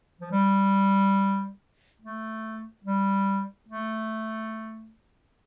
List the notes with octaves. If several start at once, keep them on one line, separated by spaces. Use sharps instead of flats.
F3
G3
A3
G3
A3